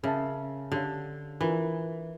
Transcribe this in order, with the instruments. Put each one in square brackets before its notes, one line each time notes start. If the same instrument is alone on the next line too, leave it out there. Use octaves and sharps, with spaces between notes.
[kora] C#3 [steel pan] A#4 E5 A5
[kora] D3 [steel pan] C#4 G4 C#5 F5
[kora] E3 [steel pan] D4 F4 A#4